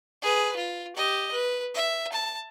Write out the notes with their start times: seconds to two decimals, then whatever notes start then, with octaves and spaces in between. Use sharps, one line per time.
0.22 G#4 B4
0.56 F4
0.96 G4 D#5
1.32 B4
1.75 E5
2.12 A5